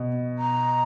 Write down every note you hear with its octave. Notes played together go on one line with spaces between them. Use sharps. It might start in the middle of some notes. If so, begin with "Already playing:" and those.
Already playing: B2
A#5